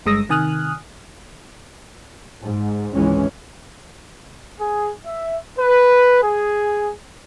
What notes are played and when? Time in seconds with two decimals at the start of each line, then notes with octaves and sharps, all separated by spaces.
0.06 G1 G2 G#3 D#6 E6 A#6
0.29 C3 D#3 G#5 D#6 F6 F#6
2.42 G#2
2.92 G#1 C#2 E3 G#3 C#4
4.59 G#4
5.05 E5
5.58 B4
6.21 G#4